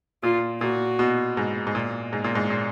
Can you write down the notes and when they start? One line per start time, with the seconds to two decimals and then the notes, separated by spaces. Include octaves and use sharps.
0.23 A#2 F4
0.61 A#2 F#4
0.99 B2
1.37 G#2
1.67 G#2
1.75 A#2
2.13 G#2
2.24 A#2
2.35 G#2
2.50 A#2